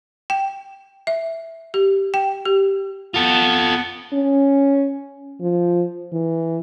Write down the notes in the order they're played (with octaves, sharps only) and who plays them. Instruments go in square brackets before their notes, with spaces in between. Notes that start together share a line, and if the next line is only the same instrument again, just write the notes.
[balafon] G5
E5
G4
G5
G4
[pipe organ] B3 [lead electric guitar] F4 A4
[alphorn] C#4
F3
E3